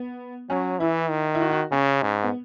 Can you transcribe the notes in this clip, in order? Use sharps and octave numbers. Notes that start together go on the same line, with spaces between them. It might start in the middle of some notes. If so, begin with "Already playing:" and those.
Already playing: B3
F#3 C#4
E3 E4
D#3
E4
F#4
F#4
C#3 C#4
G#2
B3